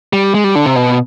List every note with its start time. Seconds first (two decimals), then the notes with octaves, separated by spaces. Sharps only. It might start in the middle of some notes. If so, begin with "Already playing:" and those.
0.13 G3
0.34 G#3
0.44 G3
0.55 D3
0.66 C3
0.76 B2